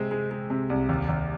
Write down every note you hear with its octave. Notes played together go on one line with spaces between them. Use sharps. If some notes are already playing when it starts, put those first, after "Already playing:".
Already playing: C3 G#3 C4
G#3
G#3
C3
C2
D#2
D#2